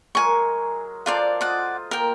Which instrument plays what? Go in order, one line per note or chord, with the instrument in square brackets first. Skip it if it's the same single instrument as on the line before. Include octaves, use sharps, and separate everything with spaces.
[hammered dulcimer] F#3 G#3 A#4 [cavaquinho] G#5 C#6
[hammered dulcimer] D4 A4 C5 [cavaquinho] F4 A#4 D5
[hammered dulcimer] F4 D#5 [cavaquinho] D5 F#5
[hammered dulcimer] A#3 [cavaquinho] A#4 G5